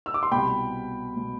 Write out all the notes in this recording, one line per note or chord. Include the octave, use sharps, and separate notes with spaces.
E6
D6
C6
C2 B2 G5 B5
B2